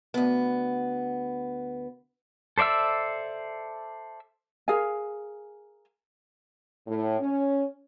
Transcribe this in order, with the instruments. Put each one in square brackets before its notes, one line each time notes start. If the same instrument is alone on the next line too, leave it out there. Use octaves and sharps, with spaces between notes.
[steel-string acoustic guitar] D2 B3
[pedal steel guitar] A4 C5 D5 E5 E6
[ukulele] G#4 A#4 F5 G#5
[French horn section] A2
C#4